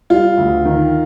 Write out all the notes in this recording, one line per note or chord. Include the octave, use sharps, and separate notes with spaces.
G3 F4
D2
D#3